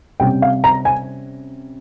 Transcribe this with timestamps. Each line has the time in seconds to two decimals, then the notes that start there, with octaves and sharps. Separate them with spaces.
0.20 C3 G3 C#4 G5
0.42 F5
0.64 A#5
0.85 G#5